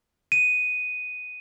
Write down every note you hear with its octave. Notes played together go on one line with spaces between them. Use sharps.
D#7